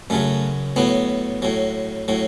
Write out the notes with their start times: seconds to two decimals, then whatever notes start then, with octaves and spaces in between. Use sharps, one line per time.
0.10 F#2 C#3 F#3 A3
0.76 A2 F#3 B3
1.42 A2 F#3
2.08 A2 F#3